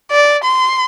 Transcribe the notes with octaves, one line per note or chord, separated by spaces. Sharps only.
D5
C6